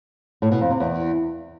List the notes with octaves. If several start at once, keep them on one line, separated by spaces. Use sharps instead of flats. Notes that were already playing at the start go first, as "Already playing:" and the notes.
A2
B2
F2
C3
E2